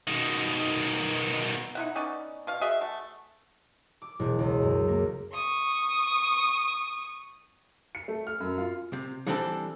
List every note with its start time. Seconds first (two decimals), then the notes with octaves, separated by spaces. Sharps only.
0.08 B2 D#3
1.75 D#4 E4 F#5
1.95 B3 C#4 D#4 D5
2.47 B2 F5
2.61 F#4 G#4 D#5 E5
2.81 A3
4.02 D6
4.19 E1
4.39 C#2
4.62 F#2
4.88 A#3
5.34 C#6 D#6
7.95 C#7
8.08 A3
8.27 F6
8.40 F#2
8.58 F4
8.93 C3
9.27 E3 G3 C4 D4 G4 A4